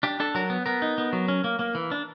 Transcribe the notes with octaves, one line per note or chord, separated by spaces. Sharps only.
D4 G4
D4 A4
F#3 A#4
B3
B3 A#4
D#4
B3
F#3
C#4
A#3
A#3
E3
D4